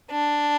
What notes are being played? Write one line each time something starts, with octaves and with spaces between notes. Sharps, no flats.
D4